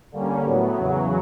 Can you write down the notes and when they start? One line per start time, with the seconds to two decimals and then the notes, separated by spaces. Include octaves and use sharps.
0.12 D3 G3 A#3 C#4
0.44 A2 F#3 B3
0.76 E2 C#3 F#3